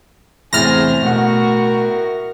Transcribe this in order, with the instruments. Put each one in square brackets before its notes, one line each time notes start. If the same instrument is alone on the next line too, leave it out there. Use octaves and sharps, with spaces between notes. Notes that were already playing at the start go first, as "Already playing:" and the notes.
[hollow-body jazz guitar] E2 C3 [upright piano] A2 A6 [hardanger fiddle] G#4 C5 [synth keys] F6 A#6
[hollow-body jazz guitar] B2 A3 F#5 [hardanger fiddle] F#4 A#4